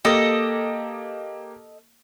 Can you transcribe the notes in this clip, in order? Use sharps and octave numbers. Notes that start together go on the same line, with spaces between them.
A#3 G4 A4 D#5